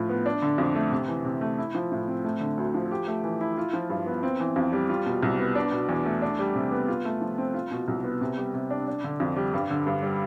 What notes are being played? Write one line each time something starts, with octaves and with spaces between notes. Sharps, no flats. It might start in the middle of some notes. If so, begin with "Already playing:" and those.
Already playing: A2 F3 F4
B3
D4
D3
F2
A3
C3
E3
C3
A3
E4
F3
A2
C4
A3
D3
D2
F3
G4
A3
E3
E4
F4
F3
G2
B3
C4
E3
F2
G3
F4
B2
C2
B3
D4
B2
E2
A3
D4
G3
C3
B3
F4
A3
F3
C4
F4
B2
C2
B3
C3
G3
C3
D4
D4
D3
F2
G3
G2
D3
G2
G3